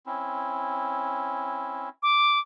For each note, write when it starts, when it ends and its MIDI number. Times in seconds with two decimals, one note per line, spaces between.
0.06 1.89 60
0.06 1.89 61
0.06 1.89 64
2.03 2.39 86